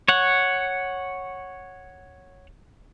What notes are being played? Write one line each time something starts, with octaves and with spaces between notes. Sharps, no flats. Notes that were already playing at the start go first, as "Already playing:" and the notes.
C#5 F#5